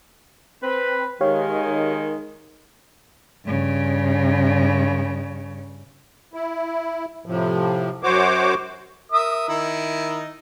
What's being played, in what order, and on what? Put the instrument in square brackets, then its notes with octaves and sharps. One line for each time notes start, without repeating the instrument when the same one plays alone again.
[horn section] C4 B4
[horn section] D#3 G#3 [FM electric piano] G4 C#5 F5
[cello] G2 C#3
[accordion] E4
A2 C3 F3
F#2 F#4 C5 C#5 D6
[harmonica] A#4 E5 D#6
D#3 D#4 E4